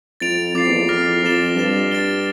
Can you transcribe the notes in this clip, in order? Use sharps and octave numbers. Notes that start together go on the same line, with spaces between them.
F2 A6 D7 F7
F2 D6 A6 C7
E2
F2
D6 F6 A#6
F2 F6 A6 E7 G7
G2 A6 E7 G7
A6 D7 G7